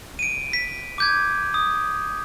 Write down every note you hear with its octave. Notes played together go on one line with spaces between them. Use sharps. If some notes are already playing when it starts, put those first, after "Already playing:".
D7 D#7
B6
D6 G6 G#6
D#6